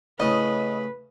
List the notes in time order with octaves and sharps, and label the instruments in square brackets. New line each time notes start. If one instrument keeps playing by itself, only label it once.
[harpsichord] A2 C#3 [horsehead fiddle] B4 [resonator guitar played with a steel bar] D#5